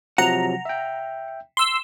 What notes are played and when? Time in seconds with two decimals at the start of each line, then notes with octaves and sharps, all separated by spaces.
0.18 C3 F3 F#3 F#5 A#5
0.65 E5 G5
1.57 C6 E6